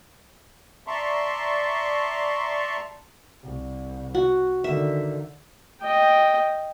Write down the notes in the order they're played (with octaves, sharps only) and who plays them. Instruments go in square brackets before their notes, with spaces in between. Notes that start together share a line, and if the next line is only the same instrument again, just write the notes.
[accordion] D5 E5 A5 A#5 C6 C#6
[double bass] C2
[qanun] F#4
[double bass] D3 D#3 [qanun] E5
[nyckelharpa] D#5 G5